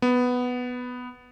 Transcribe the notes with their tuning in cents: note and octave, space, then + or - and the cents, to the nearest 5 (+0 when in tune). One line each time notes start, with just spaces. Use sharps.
B3 +5